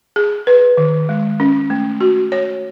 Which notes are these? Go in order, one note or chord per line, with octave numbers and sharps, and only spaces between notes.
G#4
B4
D#3
G#3
C#4
A3
F#4
C#5